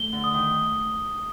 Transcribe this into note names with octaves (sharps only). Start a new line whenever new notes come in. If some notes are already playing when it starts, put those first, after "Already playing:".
Already playing: A3 G7
D3
D#6
D#3